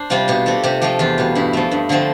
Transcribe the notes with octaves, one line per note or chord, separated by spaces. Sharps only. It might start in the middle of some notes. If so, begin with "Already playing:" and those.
Already playing: D4 C5
C3 G3 C4 F4
B2 G4
A3 C4 A4
C3 G4
F3 A3 G4
E2 F4
B2 G3
G2 E4
F3 A3
G2
D3 F3 A3 C4